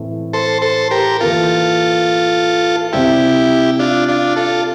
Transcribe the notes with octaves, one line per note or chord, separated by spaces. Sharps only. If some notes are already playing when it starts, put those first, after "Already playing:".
Already playing: A2 E3 A3 C4 E4
A4 C5
A4 C5
G4 A#4
E3 A#3 E4 F4 A4
C3 G3 C4 E4 G4
D4 F4
D4 F4
F4 A4